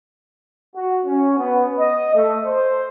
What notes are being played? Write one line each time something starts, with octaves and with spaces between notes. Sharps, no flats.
F#4
C#4
B3
D#5
A3
C5